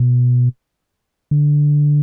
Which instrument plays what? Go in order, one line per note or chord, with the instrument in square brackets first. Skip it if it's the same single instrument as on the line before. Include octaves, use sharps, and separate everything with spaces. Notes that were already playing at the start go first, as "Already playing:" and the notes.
Already playing: [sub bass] B2
D3